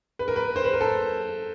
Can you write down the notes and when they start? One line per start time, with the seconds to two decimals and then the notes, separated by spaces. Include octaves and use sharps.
0.19 B4
0.28 A#4
0.36 B4
0.56 C5
0.64 B4
0.73 A#4
0.81 A4